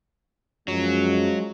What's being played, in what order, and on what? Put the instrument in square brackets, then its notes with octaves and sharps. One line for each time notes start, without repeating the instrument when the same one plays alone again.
[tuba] F#2 [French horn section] F3 G#3 [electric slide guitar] F#3